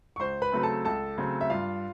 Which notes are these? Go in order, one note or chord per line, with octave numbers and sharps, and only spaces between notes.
C#6
C#2 C5 C6
B4 B5
C#3 F#3 A3 C4
A4 A5
C#2 A4 A5
C#3 F#3 A3 C4
E5
G2 F4 F5